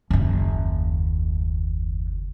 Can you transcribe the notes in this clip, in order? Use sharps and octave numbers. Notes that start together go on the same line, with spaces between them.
F#1 D#2